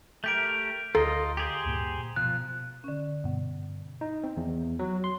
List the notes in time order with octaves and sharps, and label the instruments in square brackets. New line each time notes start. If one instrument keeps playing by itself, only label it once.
[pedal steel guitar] A3 G4 A#4 [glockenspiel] G6 D7
[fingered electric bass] D2 [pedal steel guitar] F4 D#5 [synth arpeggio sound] A4 [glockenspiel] A#5
[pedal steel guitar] G4 G#4 C5
[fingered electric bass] D2 G2 A#2
[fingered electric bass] B2 [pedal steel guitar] F3 [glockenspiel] F#6
[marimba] D3 C#4
[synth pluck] G2 B2
[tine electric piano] D#4
C4
E2
F#3
C6